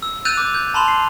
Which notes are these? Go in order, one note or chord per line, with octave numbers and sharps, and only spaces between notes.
E6
E6 F#6 G6 A6 D#7 F7
D6
G6
A5 B5 C6 F7
C7